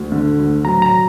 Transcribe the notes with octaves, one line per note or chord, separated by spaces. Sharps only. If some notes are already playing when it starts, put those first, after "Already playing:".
Already playing: D2
D3
D2
F#3 A#5
A#5